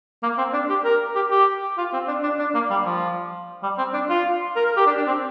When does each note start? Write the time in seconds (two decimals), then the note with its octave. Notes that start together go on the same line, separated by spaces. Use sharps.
0.23 A#3
0.38 C4
0.53 D4
0.69 G4
0.84 A#4
1.15 G4
1.31 G4
1.78 F4
1.93 C4
2.08 D4
2.23 D4
2.39 D4
2.54 A#3
2.71 G3
2.85 F3
3.63 G3
3.78 C4
3.94 D4
4.10 F4
4.56 A#4
4.66 A#4
4.77 G4
4.87 D4
4.97 D4
5.07 C4